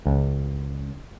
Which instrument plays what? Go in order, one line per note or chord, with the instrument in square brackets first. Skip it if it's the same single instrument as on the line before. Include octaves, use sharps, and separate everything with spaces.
[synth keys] C#2